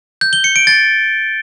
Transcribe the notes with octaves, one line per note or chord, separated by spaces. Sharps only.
G6
G7
C#7
D7
A6